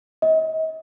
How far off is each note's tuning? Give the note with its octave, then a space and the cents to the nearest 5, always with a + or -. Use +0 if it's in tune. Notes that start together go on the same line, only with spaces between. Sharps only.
D#5 +40